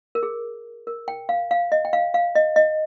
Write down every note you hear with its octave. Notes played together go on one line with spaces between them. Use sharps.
A#4
G#4
A#4
G5
F5
F5
D#5
G5
F5
F5
D#5
D#5